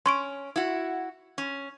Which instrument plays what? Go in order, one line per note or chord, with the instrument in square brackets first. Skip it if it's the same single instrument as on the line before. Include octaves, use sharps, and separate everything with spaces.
[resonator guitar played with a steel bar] C#4 [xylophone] C6 C#6 D7
[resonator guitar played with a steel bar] E4 F#4
C#4